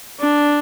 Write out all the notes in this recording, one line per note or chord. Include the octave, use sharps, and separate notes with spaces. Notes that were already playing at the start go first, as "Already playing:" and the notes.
D4